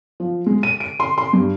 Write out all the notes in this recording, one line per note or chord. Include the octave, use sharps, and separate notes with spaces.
F3
G#3
D#7
D7
C6
C6
G2